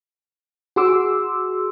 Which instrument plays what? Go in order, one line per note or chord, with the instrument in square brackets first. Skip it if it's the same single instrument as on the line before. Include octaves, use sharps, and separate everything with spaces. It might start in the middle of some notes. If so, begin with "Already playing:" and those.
[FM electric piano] F#4 G#4 C6 D6 E6